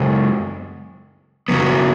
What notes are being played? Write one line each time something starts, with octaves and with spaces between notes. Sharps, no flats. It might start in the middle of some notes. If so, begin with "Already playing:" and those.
Already playing: F#2 C#3 G#3
F#2 C#3 F#3 B3